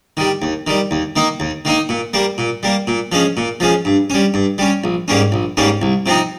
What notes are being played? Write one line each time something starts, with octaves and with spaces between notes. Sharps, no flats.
D#3 G3
D#2
D#3 G3
D#2
D#3 A#3 D#4
D#2
D#3 A#3 D#4
A#2
G3 A#3
A#2
G3 A#3
A#2
F3 G#3 C#4
A#2
F3 G#3 C#4
G2
G3 C#4
G2
G3 C#4
A#1
G#2 G3 A#3 C#4
A#1
G#2 G3 A#3 C#4
C2
C3 F3 C4 D#4